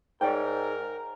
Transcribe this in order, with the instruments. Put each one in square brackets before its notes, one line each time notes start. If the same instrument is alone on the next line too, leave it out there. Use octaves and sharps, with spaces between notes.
[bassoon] G#2 [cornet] A#4 [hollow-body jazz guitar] C#5 D5 G5